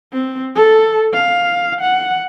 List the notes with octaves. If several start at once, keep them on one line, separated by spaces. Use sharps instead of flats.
C4
A4
F5
F#5